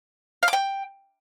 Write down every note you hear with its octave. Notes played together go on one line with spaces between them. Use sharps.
F5
D6
G5